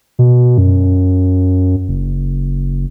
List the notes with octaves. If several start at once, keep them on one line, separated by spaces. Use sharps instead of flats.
B2
F#2
F#1